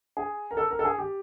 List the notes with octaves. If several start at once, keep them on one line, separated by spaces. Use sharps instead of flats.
G#4
A#4
A4
A#4
A4
G#4
G4